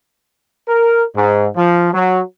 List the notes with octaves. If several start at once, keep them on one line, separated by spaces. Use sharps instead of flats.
A#4
G#2
F3
F#3